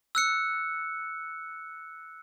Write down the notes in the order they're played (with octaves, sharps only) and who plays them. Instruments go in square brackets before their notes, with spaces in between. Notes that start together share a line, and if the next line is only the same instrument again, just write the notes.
[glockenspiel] E6 F#6 C#7